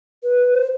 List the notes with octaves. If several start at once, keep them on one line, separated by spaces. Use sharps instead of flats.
B4
C5